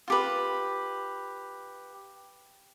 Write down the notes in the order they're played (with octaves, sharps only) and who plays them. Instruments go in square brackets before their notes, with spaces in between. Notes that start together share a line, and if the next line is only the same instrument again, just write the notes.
[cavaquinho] F4 G4 B4